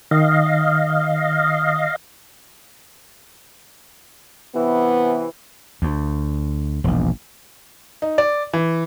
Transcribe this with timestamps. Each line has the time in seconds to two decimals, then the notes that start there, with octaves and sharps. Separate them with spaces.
0.11 D#3 D#5 F5
4.55 C3 E3 B3
5.82 D2
6.84 E1 A#1
8.02 D#4
8.18 D5
8.53 E3